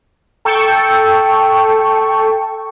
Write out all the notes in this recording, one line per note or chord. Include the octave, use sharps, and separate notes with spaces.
A4 G5 C#6